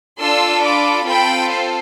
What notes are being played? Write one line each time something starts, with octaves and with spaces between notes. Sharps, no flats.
D4 F4 A4 C6 E6
B5 D6
C4 F4 A4 G5 B5
C5